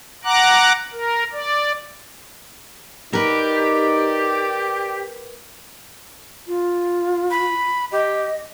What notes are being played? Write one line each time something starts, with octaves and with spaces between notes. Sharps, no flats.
F#5 A#5 D6 F#6
A#4
D5
D#4 G4 A#4 B4 D5
F4
B5
G4 D#5